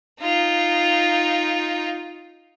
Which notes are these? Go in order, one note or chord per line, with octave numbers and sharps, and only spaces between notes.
D#4 F4